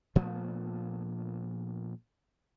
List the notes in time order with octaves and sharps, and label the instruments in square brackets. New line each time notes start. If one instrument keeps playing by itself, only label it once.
[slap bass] A#2 F3 A3 B3